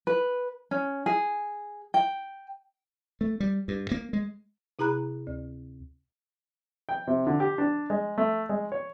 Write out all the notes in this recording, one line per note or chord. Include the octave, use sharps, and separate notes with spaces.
B4
C#4
G#4
G5
A3
G3
G2
A#3
G#3
C3 E4 G#4 A#5 B5 F#6
D2
G5
C3
D3
G4
D4
G#3
A3
G#3
C#5